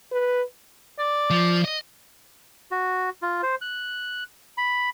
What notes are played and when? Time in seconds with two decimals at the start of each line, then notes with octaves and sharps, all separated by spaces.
0.12 B4
0.99 D5
1.31 F3
1.65 D#5
2.71 F#4
3.22 F4
3.43 C5
3.61 F#6
4.57 B5